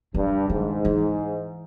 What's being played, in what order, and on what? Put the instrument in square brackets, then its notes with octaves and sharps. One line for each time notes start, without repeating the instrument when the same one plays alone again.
[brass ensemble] G2 [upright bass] D3
[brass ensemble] G#2 [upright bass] D#3
[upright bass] E3